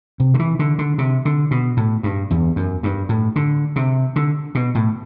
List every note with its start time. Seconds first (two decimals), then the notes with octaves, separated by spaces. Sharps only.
0.20 C3
0.34 D3
0.39 E3
0.59 D3
0.79 D3
0.98 C3
1.25 D3
1.51 B2
1.77 A2
2.03 G2
2.31 E2
2.56 F#2
2.83 G2
3.09 A2
3.36 D3
3.76 C3
4.16 D3
4.55 B2
4.75 A2